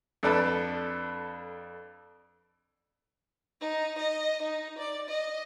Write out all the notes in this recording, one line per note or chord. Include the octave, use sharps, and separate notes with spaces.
F2 D4 A4 B4 A5
D#4
D#5
D#4
D5
D#5